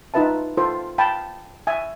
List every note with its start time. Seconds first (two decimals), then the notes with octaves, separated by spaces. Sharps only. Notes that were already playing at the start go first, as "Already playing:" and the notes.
0.14 D#4 F4 B4 E5 A5
0.57 F4 A4 C5
0.98 F5 G5 A5 B5
1.67 E5 G#5